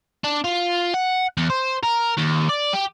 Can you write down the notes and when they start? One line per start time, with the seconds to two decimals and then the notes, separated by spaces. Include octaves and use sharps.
0.24 D4
0.44 F4
0.94 F#5
1.37 E2
1.50 C5
1.83 A#4
2.17 D#2
2.49 D5
2.73 G4